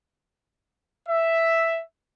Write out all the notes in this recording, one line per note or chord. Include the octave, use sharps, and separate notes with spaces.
E5